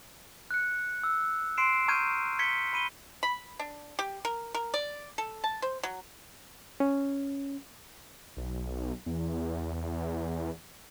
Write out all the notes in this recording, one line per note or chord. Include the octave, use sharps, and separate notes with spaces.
F#6 C#7
E6
C6 C7 D7 E7
A#5 C#6 F6 G6 G#6 D#7
G#6 B6 C#7 G7
B5 D#7 G7
B5
D4
G4
A#4
A#4
D5
A4
A5
C5
F#3
C#4
B1
E2